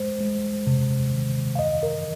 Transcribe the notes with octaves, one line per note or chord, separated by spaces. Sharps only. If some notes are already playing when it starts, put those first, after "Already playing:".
Already playing: G#3 C5
G#3
C3
D#3
F5
F#2 D#5
A#4